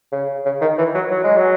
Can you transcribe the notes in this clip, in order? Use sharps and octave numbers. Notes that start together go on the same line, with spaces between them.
C#3
C#3
D#3
E3
F#3
F#3
G#3
F#3